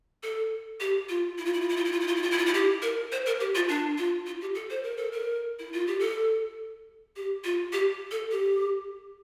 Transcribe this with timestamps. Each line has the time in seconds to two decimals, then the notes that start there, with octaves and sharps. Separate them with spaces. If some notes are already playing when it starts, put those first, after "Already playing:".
0.23 A4
0.80 G4
1.09 F4
1.38 E4
1.45 F4
1.54 E4
1.61 F4
1.69 E4
1.77 F4
1.85 E4
1.92 F4
2.00 E4
2.07 F4
2.16 E4
2.23 F4
2.31 E4
2.38 F4
2.46 E4
2.54 G4
2.82 A#4
3.12 C5
3.26 A#4
3.40 G4
3.55 F4
3.69 D4
3.98 F4
4.26 F4
4.41 G4
4.55 A4
4.70 C5
4.83 A#4
4.97 A4
5.12 A#4
5.59 E4
5.73 F4
5.87 G4
6.00 A4
7.16 G4
7.44 F4
7.73 G4
8.11 A4
8.31 G4